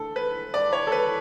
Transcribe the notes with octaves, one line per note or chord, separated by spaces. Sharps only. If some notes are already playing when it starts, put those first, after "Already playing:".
Already playing: D3 A3 A4
B4
D5
C#5
A4
B4